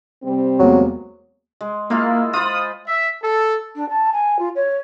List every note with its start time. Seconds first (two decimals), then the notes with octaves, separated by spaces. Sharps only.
0.23 C3 G3 C4
0.59 E2 F#3 G#3 A#3
1.61 G#3
1.90 G#3 A#3 E4 F4
2.33 F4 C5 B5 D#6
2.87 E5
3.22 A4
3.75 D4
3.89 A5
4.12 G#5
4.39 F4
4.55 C#5